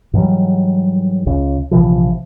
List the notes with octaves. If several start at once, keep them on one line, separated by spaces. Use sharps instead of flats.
G#2 E3 F#3 G3
C#2 C#3
A#1 C3 E3 F3